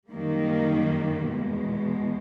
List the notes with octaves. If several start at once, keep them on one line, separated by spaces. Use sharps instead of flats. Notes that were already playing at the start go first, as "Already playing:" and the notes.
F#2 D#3 G3 A#3
E2 B2 G#3